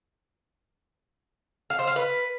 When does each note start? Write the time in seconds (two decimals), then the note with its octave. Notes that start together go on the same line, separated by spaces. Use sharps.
1.70 F5
1.79 C5
1.87 F5
1.96 B4